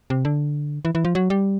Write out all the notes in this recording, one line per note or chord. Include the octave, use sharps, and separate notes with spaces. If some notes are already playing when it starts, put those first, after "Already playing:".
C3
D3
E3
E3
F3
F#3
G3